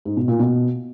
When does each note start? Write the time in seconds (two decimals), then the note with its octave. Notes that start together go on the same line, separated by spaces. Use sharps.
0.05 G#2
0.17 B2
0.28 A#2
0.39 B2